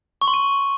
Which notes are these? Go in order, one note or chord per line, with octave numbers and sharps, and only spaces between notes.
C#6
C6
D#7